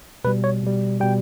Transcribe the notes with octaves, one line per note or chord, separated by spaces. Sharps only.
B2 G3 B4
C#5
B2 G3
B2 G3 G5